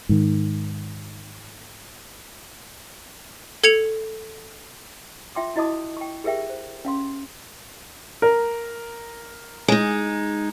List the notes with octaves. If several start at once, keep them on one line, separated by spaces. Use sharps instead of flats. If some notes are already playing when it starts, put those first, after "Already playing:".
G#2 D#3
A4 G#6 C#7 F7
F4 E5 G5 C6 D6
E4 F#4 D#5 A5 D6 D#6
G5 C#6
G4 G#4 A#4 E5 G5
C5
C#4 F5 C6
A#4
G#3 D#4